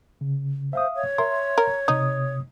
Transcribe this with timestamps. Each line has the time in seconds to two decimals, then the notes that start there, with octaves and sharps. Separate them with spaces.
0.21 C#3
0.73 C5 E5 F5 D#6
0.95 C#5
1.18 A#4 E5 C6
1.58 A#4
1.88 C3 D#4 D#6